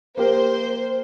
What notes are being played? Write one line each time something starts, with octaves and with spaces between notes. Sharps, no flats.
A#3 G4 A#4 C5